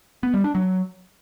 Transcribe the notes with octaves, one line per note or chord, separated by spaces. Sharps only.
B3
G3
D4
F#3